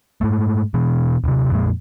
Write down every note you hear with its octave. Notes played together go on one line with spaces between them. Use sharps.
G#2 A3
B2 E3
D#1 C3
F2 A#2 G#3